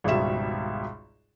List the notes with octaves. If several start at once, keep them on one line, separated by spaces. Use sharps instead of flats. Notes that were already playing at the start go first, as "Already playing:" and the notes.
G#1 C#2 B2 G3 E5 E7